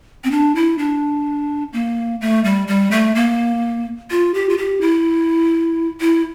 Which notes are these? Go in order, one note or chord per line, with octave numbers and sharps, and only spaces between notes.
C4
D4
E4
D4
A#3
A3
G3
G3
A3
A#3
F4
G4
F4
G4
E4
E4